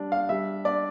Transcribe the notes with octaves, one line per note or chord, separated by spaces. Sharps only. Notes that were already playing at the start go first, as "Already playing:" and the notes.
Already playing: G3 D4
F5
G3 E5
D4 D5